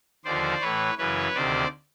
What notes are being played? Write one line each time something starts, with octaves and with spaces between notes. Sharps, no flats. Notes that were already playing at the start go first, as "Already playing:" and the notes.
D#2 D3 F3 C5 D5
A2 E3 B4 C#5
F#2 C#3 E3 B4 C#5
D2 C3 D#3 C5 D5